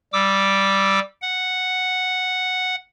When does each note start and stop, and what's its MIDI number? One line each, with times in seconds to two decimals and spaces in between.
0.13 1.00 55
0.13 1.00 86
0.13 1.00 88
1.22 2.75 78